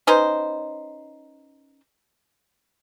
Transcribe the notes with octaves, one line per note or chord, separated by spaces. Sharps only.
C#4 D#4 B4 C5